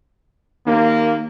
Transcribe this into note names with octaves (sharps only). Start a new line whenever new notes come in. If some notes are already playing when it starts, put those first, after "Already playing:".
D#2 A#3